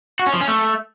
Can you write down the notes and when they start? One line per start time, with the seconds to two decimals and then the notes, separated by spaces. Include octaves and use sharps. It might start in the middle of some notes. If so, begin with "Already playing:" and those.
0.19 F#4
0.26 C#4
0.34 F3
0.41 C#4
0.48 A3